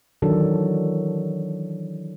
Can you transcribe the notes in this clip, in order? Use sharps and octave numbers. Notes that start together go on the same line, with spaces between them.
D#3 E3 F#3 D4 A4